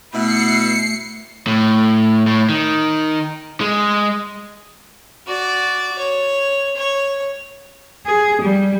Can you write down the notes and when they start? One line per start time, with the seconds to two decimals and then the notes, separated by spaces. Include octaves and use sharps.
0.13 B2 A3 E4 C7 C#7
1.47 A2
2.27 A2
2.49 D#3
3.61 G#3
5.28 F#4 D5
5.98 C#5
6.76 C#5
8.06 G#4
8.42 G3